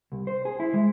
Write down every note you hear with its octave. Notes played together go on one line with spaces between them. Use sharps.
C2
C5
G#4
E4
G#3